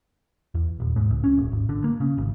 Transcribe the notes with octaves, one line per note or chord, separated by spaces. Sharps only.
E2
D#1
G#2
C#2
C#4
D#1
G#1
D3
A#3
C#3
G#1